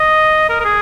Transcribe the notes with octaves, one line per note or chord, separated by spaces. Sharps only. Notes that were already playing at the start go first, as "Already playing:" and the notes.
Already playing: D#5
A#4
A#4
G#4